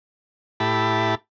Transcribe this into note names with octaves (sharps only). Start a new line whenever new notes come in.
A2 E4 G4 A5 B5